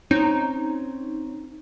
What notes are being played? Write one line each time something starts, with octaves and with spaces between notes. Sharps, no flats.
C4 C#4 D#4